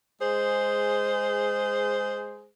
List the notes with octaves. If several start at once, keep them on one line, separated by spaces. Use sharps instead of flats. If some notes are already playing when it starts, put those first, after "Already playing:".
G#3 G#4 C5